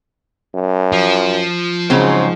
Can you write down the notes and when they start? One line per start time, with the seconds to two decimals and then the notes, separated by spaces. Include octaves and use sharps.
0.54 F#2
0.93 F3
1.90 G#2 C#3 F#3 C4